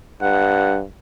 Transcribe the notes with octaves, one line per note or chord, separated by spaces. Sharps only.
G2 F#5